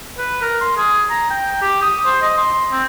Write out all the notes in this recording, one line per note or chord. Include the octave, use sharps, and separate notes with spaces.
B4
A#4
C6
G#4
A#5
G5
G4
D#6
C5
D#5
C6
C4